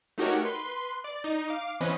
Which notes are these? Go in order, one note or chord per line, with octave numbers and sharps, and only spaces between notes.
A3 D#4 F#4 G4 A#4 C#5
B4 C6
D5
D#4
F5 D6
E3 B3 C#4 B4 C5 D#5